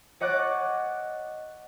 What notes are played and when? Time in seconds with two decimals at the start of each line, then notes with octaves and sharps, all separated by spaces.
0.20 C#5 D#5 F#5 D6 F#6 A6